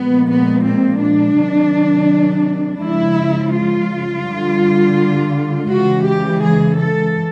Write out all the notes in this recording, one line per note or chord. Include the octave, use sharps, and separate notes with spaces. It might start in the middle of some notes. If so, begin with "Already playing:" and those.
Already playing: A#2 F3 G#3 B3
B3
C4
D4
C3 D#3 F#3
C#3 F3 G#3 E4
F4
D3 G3
C#3 E3 G#3 F#4
G4
G#4
A4